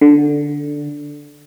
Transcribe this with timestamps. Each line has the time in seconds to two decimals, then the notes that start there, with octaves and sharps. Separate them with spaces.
0.01 D3